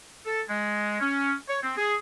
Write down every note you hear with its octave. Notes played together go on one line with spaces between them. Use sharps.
A4
G#3
C#4
C#5
C4
G#4